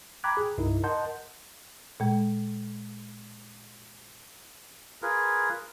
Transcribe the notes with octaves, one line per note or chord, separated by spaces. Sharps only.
G5 A#5 B5 D6 F#6 G#6
G#4
C2 G2 D#4 E4 A#4
A#4 D#5 F#5 A5 C6 G6
A#2 G#3
F4 G#4 A#4 B4